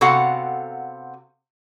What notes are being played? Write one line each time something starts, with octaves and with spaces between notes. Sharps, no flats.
C3 B3 F#4 A4 F5 F#5